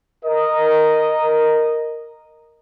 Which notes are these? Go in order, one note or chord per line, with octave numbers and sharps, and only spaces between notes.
A#4 D#5